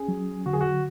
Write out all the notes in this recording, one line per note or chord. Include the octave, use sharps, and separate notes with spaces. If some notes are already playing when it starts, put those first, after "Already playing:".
Already playing: C#4 G#4
F#3
D3 F#4
G#4
F#4